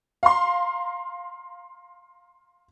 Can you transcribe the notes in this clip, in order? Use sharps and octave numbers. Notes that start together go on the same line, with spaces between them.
F5 A#5 C6